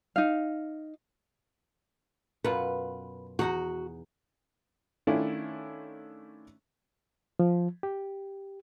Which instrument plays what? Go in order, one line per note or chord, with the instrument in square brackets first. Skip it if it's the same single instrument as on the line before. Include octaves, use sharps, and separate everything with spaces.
[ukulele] D#4 F5
[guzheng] F#2 B2 F4 [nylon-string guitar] B4
[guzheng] E2 D#4 F#5 [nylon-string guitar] F#4
[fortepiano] D#3 A3 C#4 D4 E4 F4
[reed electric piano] F3
G4